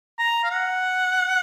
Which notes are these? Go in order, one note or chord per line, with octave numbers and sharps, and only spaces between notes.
A#5
F5
F#5